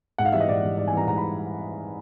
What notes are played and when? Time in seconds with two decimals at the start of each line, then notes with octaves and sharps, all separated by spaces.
0.18 G#2 F#5
0.25 F5
0.32 E3 G3 E5
0.40 D#5
0.48 G#2 D5
0.63 E3 G3
0.78 G#2 D5
0.88 G#5
0.93 E3 G3 A#5
1.06 G#2 A#5
1.17 B5